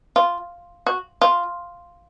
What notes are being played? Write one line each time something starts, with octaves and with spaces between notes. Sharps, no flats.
F4
F#4
F4